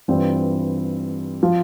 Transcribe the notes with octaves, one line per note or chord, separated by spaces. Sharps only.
G2 E3 G3 C4 F4
F3